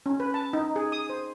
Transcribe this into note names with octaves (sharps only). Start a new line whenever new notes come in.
C#4
B4
A5
D#4
G#4
D#6
C5